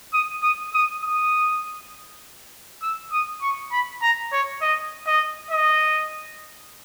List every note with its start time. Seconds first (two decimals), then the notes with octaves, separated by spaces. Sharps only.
0.13 D#6
0.43 D#6
0.74 D#6
1.03 D#6
2.82 E6
3.12 D#6
3.41 C#6
3.71 B5
4.02 A#5
4.32 C#5
4.61 D#5
5.06 D#5
5.50 D#5